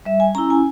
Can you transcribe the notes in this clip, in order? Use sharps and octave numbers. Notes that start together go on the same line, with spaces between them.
G3 E5
G#5
C#4 E4 A#5
G#5